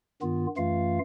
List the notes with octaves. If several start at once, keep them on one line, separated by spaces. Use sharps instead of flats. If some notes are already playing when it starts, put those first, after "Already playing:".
G2 D#3 B3 F4
F#2 E3 A3 F4 F5